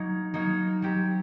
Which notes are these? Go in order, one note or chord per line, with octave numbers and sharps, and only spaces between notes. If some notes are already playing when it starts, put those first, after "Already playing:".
Already playing: F#3 A#3 D#4
F#3 A#3 D#4
F#3 C4 G4